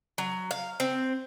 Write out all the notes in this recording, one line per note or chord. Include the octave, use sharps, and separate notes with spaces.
F#3
F5
C4